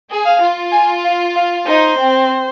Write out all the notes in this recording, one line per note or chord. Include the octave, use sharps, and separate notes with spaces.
G#4
F5
F4
G#5
F5
F5
D#4 C5
C4